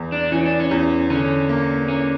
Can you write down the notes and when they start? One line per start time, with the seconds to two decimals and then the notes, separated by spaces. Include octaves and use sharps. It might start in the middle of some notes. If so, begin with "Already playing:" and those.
Already playing: E2 E3
0.12 D4
0.31 E3 C#4
0.46 D4
0.60 C#4
0.71 E2
1.10 D3 C#4
1.49 A#3
1.88 A#3 C#4